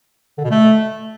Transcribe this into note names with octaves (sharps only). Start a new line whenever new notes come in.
D3
B2
A3